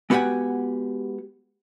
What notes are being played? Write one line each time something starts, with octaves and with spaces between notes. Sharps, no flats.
G#3 B3 F#4 G4 F#5 G#5